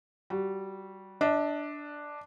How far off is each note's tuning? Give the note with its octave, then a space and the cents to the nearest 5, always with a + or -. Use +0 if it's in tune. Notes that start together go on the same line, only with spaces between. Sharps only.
G3 -15 F#4 +0
D4 +0 D#5 +45